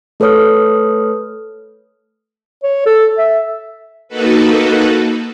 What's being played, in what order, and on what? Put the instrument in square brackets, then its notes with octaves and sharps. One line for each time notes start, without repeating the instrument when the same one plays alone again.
[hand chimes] A3 A4 B4 C#5 D#6 F6
[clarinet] C#5
A4
E5
[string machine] A#3 D#4 F#4 A4 B4